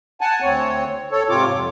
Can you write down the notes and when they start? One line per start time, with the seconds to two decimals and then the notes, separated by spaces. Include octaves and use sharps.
0.21 F#5 G#5 A5
0.42 D2 C4 C#5
1.11 A4 C#5
1.29 G#2 C3 C4 F4 C#5 D6
1.51 F2